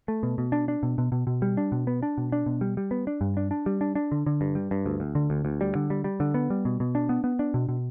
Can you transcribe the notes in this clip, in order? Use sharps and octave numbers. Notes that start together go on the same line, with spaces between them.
A3
B2
B2
D4
D4
B2
B2
B2
B2
G3
D4
B2
B3
D4
B2
D4
B2
G3
G3
B3
D4
G2
D4
D4
G3
D4
D4
D3
D3
G2
G3
G2
D2
D2
D3
D2
D2
G3
D3
G3
G3
D3
B3
G3
B2
B2
D4
B3
B3
D4
B2
B2